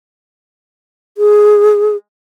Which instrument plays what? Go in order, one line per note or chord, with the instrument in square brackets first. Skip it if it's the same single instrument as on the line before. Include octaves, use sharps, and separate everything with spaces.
[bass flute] G#4